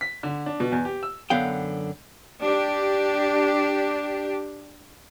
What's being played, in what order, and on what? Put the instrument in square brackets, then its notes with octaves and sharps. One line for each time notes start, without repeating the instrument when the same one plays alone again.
[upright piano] B6
D3
D4
B2
E2
G4
E6
[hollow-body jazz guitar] F#2 D3 B3 F5 G5
[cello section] D4 G4